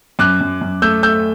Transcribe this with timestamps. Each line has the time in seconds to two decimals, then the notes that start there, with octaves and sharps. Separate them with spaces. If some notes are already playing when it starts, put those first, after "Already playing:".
0.19 F#2 D6 F#6
0.41 F#2
0.61 F#2
0.82 A3 E6 G6
1.03 A3 E6 G6